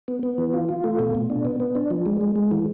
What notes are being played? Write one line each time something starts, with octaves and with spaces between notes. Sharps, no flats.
B3
B3
E3
F4
F4
A3
B2
B2
D4
B3
B3
D4
F3
G#3
G#3
G#3
E3